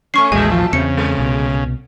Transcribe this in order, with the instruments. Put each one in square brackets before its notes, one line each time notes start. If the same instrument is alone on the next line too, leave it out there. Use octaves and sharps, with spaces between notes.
[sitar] A3 C#4 [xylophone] C#6 C7
[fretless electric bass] A1 D#2 [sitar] A#2 A3 E5 [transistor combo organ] G#3 [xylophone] G#5
[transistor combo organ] F3
[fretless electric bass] E2 C4 [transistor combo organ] C#3 [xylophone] C#7
[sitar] G#3
[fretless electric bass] C2 B2